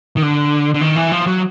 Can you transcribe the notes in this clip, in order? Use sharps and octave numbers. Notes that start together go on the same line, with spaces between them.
D#3
D3
D3
D#3
E3
F3
F#3